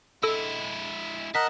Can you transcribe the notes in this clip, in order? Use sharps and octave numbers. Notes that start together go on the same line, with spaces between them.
G#3 E4 A4 E6
G#2 A#4 D#5 F#5 A5 B6